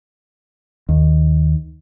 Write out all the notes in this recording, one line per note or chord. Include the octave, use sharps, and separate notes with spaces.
D#2